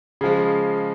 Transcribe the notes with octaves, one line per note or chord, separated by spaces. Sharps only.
C#3 F3 G#3